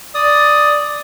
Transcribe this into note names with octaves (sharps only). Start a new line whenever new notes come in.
D5 D#6